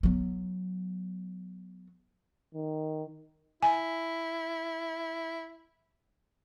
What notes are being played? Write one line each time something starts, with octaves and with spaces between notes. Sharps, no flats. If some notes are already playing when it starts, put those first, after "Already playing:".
F#3 B3
D#3
E4 G#5